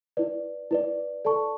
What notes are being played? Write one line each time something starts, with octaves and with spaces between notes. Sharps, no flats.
E4 B4 D5
E4 B4 D5
A4 D5 A5 C#6